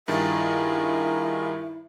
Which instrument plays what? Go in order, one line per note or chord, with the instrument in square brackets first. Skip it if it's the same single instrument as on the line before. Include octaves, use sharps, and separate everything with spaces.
[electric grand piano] G2 D#3 A6 [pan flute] E4 [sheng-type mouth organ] F4 G#4 A#4 [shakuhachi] E5